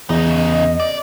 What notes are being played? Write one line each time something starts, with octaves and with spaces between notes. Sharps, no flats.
E2 C#3 D#4
D#5
D5